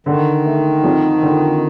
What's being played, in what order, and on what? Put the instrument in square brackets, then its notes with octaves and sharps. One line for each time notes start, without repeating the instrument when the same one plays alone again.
[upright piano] D3 [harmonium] D#3
[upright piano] A3
F2
D3